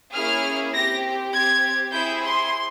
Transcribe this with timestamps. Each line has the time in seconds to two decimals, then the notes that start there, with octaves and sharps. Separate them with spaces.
0.14 A#3 C#4 E4 G#4 F6
0.74 C4 G4 A#6
1.33 C4 G4 G#6
1.92 C4 E4 G#4 G6
2.22 C6